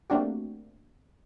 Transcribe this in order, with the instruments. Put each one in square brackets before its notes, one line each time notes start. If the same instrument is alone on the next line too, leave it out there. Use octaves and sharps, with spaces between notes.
[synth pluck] A3 A#3 C4 D4 F#4 G4